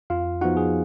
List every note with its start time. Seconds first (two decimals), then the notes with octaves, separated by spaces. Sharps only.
0.10 F2 F4 F5
0.41 F3 B3 D#4 F#4 F#5
0.57 G#4